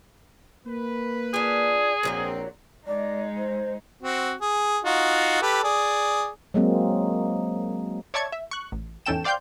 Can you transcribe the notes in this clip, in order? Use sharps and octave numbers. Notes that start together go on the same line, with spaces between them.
A#3 B4
D4 F4 G#4
A#1 A#2 E3 F#3 C4
G#3 D#4 D5
C5
C4 F#4
G#4
D#4 F4 F#4
G4 A4 B4
G#4 D5
F#3 G#3 A#3 C4
C#5 D5 E5 A5 C#6 G#6
E5
C#6 F#6
A1
E2 G#2 C#4 A4 G5 E7
C5 D5 F5 G5 C6 G6